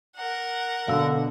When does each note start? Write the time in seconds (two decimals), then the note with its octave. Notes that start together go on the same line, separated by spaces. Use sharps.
0.16 A#4 F#5
0.88 B2 D3 F5 E6